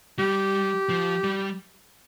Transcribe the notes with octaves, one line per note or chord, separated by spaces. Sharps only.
G3 G4
F3
G3